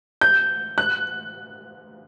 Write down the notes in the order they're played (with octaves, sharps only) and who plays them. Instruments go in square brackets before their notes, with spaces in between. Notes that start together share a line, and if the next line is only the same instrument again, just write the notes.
[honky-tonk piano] G6
F#6